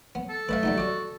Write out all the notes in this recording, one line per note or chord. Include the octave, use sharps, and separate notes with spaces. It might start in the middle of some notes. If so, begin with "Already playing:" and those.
B3
A4
A3 B4 D#5 F5
G3 B3 D#4
F#4 D5 D#5